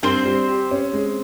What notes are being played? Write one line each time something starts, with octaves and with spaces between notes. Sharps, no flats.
G2 C4 C5
G3
G4
C#4
G#3